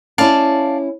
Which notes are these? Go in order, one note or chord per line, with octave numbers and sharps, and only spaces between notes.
C#4 E4 D5 F5 A5